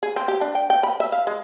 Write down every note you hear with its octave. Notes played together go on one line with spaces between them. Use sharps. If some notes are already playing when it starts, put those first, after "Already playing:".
G#4
C4
G4
D4
G5
G5
B5
E5
F5
G#3